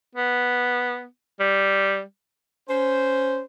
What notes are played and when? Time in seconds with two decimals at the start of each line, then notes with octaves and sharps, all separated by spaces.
0.15 B3
1.40 G3
2.68 C#4 C5